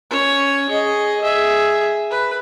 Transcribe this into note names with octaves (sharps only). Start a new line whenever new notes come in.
C#4 C#5
G#4 D#5
G#4 E5
B4